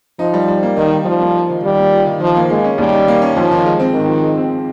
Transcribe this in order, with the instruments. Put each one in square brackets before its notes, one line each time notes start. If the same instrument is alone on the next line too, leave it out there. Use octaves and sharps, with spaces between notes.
[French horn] F3 [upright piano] D#4
[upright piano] G3
G3
A#3
[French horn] D#3 [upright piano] D#4
[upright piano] G3
[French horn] F3 [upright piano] G3
[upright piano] A#3
F4
D#3
[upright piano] D#3 [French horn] G3
[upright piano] A#3
F4
D#3
[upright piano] D#3 [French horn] F3
[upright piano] A#3
[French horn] G#3 [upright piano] A#3
[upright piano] C#4
[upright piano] D#2 [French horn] G3
[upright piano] D#3
A#3
C#4
[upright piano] D#2 [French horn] F3
[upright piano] D#3
G#3
C4
[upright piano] G#2 [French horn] D#3
[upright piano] F3
G#3
C4